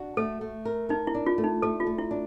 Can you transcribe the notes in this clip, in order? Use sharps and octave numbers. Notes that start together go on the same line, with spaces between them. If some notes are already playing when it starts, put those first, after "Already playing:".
Already playing: D4 F#4
A3 A4
A3
A#4
D#4 A#4
E4
D4
F4
A3
D#4
A3 A4
F4
A3
E4
D4